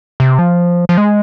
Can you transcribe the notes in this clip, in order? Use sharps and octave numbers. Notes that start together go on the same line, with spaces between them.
C3
F3
F3
G#3